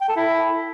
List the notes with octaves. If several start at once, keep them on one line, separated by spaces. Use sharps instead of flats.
G5
A4
E4